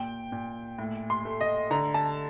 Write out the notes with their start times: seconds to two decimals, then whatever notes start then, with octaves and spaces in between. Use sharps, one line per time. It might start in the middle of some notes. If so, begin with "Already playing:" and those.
Already playing: A#2 G5
0.32 A#2
0.79 A2
1.10 C6
1.25 A3
1.41 D#5
1.71 D3 A#5
1.94 A5